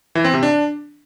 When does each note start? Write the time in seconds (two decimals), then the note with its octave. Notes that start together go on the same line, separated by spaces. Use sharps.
0.15 E3
0.24 C4
0.34 C3
0.43 D4